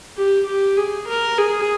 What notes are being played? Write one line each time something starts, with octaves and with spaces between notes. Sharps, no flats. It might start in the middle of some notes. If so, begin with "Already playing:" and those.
G4
G4
G#4
A#4
G#4